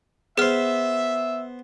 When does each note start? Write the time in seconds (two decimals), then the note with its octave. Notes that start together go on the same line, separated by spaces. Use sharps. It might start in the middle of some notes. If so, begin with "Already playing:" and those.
0.38 B3 G#4 C5 E5 F6